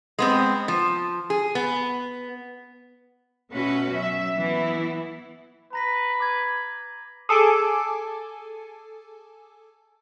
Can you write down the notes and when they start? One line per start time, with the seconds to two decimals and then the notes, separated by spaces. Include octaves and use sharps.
0.19 G#3 B3 C4
0.68 F3
1.30 G#4
1.55 B3
3.51 B2 A3 C#4 F#4 B4
3.93 F#3 E5
4.37 E3 B3 E4
5.73 B4 A#5 A#6 B6
6.20 D6 G#6
7.29 G#4 A4 G#5 D6